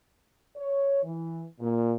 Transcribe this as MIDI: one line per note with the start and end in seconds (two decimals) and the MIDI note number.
0.56 1.02 73
1.04 1.44 52
1.61 1.93 46